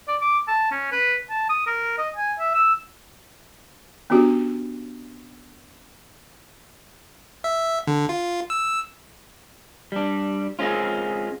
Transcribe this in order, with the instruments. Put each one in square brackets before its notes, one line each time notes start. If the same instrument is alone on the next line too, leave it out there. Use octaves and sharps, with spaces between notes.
[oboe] D5
D6
A5
C#4
B4
A5
D#6
A#4
D#5
G#5
E5
E6
[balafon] B3 C#4 D4 F#4 G4
[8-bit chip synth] E5
D3
F4
E6
[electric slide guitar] G3 D4
G#3 C4 C#4 F4